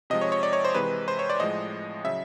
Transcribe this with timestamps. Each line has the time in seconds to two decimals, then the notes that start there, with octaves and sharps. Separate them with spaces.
0.10 C3 F3 G#3 D#5
0.21 C#5
0.32 C#5
0.43 D5
0.53 C#5
0.65 C5
0.75 C3 E3 G#3 B4
1.08 C5
1.19 C#5
1.30 D5
1.40 A2 F3 G#3 D#5
2.04 C#3 F#3 E5